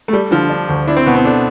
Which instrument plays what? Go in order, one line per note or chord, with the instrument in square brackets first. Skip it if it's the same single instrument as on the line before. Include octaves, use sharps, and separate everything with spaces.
[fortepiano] A3
[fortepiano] G3 [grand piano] A4
[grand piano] D3 [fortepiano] F3
[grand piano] D4
D2
[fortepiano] D4 [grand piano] E4
[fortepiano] C4
[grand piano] B2 [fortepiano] B3
[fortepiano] C4
[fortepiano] D4 [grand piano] A4